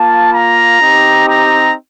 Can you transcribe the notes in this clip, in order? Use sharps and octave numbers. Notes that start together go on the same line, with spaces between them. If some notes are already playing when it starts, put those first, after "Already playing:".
Already playing: A#3 F4 A5
A#5
C4 D#4 G4
A#5